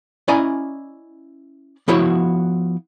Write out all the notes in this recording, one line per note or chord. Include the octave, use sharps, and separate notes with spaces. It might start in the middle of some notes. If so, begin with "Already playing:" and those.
C#4 E4 D5 D#5 G#5 A#5
F3 B3 E4 F#4 C#5